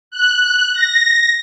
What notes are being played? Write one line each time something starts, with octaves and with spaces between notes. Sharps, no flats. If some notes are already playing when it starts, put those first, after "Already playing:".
F#6
A#6